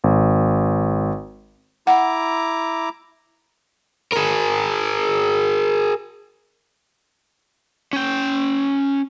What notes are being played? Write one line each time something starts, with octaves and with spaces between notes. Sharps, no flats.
G#1
E4 F#5 A#5 D6
G#4 A#4
C#4 G5